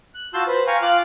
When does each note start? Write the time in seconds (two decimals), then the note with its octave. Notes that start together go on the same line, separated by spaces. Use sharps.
0.14 F#6
0.34 F4 F#4 A5 C6 E6 G6
0.47 B4 C5
0.67 F5 G5 G#5 A#5 C#6
0.82 F4 F5 D6 F#6